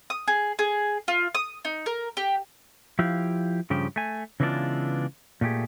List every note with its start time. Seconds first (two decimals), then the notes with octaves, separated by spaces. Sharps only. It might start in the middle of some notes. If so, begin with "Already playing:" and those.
0.10 D#6
0.28 G#4
0.59 G#4
1.08 F4
1.35 D#6
1.65 D#4
1.86 A#4
2.17 G4
2.99 F3 E4 G4 F5
3.70 G2 C#3 F3 G4
3.96 A3 G#5
4.40 C#3 E3 G#3 B3 D4 F4
5.41 A#2 A3 G4 G#4